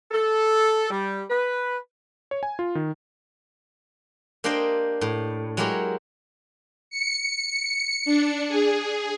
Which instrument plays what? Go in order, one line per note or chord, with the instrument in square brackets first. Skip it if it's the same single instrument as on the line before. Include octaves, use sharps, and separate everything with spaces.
[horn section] A4
G3
B4
[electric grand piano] C#5
G#5
F4
D#3
[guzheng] A#3 D4 G4 C5 D#5 G5
A2
F#3 G#3 E4 G4 A#4 C#5
[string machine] C#7
D4
G#4